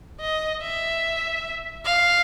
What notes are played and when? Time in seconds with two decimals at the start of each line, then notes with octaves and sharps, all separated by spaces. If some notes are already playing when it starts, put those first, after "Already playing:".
0.20 D#5
0.62 E5
1.85 F5